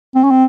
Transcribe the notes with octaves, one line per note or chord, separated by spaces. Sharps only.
C4
C#4
C4